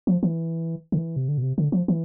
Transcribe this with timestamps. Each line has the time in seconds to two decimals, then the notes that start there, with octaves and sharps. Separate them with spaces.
0.07 F3
0.23 E3
0.92 D3
0.98 E3
1.16 C3
1.28 D3
1.38 B2
1.42 C3
1.58 D3
1.72 F3
1.88 E3